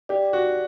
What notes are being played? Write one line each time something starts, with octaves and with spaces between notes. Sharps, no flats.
G4 D5
F#4